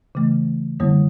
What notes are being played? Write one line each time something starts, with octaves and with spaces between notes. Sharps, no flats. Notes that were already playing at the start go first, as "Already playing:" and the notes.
C#3 E3 A3
F#2 D3 G3 A#3